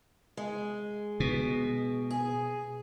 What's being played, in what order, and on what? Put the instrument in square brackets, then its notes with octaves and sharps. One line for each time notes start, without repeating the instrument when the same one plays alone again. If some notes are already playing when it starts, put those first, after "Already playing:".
[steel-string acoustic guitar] G#3
[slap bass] B2
[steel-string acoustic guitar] G#4